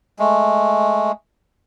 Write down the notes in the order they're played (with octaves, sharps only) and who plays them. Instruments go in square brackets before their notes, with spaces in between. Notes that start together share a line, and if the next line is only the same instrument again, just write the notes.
[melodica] G#3 A3